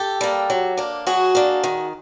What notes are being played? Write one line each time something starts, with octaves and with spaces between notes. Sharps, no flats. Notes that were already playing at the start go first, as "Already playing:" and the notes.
Already playing: G4 A4
G3 A#3
F#3
A#3 D4
F#3 F#4 G#4
A#3 D4
D#3